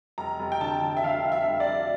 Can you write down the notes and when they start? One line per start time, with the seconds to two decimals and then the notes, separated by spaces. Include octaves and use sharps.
0.18 F1 A#5
0.39 F1
0.52 G5
0.61 D3 A5
0.81 D3
0.97 E5
1.03 D3 F5
1.25 F1
1.32 E5
1.47 F1
1.60 D5
1.69 F1